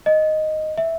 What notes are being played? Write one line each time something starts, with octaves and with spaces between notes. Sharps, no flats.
D#5
E5